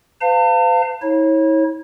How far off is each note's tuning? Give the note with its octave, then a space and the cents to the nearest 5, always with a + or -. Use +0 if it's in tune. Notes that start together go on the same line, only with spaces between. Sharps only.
B4 +45 F5 +0 A5 +40
E4 -40 C#5 -30